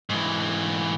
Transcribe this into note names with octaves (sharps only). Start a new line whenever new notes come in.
G#2 E3